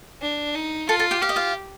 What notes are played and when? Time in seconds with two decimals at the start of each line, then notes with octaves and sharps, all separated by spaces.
0.21 D4
0.55 D#4
0.89 F4 A4 A5
0.99 A4 A5
1.11 G4 G5
1.22 G4 F5
1.29 D#5
1.36 F4 F5